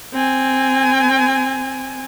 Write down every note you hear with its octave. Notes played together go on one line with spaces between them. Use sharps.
C4 G#5